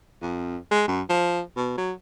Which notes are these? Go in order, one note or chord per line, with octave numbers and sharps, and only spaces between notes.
F2
G#3
F#2
F3
B2
F#3